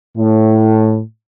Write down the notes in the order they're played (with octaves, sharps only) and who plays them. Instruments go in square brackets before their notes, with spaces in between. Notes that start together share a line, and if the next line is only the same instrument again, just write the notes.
[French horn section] A2